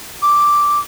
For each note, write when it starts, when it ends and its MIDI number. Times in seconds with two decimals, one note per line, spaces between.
0.22 0.80 86